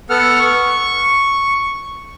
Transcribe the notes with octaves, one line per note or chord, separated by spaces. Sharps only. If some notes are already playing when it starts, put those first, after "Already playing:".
B3 A4 F#5 F6
C#6